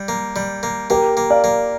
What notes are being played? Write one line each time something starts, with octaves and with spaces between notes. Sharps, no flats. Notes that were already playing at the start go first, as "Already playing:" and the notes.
Already playing: G3
A#3
G3
A#3
A#3 G4 A#4
A#3
D5 F5
A#3